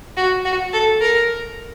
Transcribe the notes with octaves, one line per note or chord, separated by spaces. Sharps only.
F#4
F#4
A4
A#4